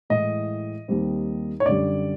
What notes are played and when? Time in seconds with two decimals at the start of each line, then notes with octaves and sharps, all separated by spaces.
0.10 A2 E3 G#3 D#5
0.88 D#2 D#3 G3 C4
1.60 C#5
1.65 F#2 D3 G3 D5